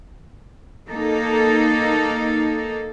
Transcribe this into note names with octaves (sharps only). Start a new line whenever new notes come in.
A#3 D#4 A4